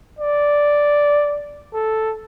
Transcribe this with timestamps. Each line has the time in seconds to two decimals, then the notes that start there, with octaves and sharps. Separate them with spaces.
0.19 D5
1.74 A4